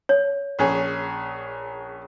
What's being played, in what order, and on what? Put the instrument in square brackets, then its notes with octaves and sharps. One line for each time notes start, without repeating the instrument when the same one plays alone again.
[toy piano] C#5
[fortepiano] A#1 C#4 G#4